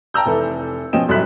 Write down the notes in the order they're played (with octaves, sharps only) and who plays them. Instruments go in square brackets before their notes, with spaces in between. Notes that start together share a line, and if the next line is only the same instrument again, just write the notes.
[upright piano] G5 A5 A#5 E6 G6
F1 E3 A4
B2 F3 C#4 D#5 G5 E7
F1 F#2 A2 G3 F#6 B6